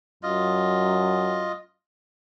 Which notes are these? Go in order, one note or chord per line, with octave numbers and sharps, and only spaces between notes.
F#2 F4 D#5